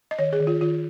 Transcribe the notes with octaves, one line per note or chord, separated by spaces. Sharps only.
D#5
D#3 C#5
G#4
D#3
F4
D#3 F4